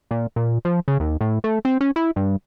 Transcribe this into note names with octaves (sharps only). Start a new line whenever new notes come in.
A#2
A#2
F3
C#3
D#2
A2
A3
C4
C#4
E4
G2